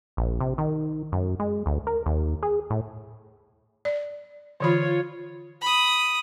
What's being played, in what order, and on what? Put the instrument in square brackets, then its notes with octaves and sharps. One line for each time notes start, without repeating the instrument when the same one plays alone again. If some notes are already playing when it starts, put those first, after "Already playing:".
[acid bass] A#1
C3
D#3
F#2
G#3
D2
A#4
D#2
G#4
A2
[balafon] D5
[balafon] D3 E3 B5 [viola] F4 C#5
[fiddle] B5 D#6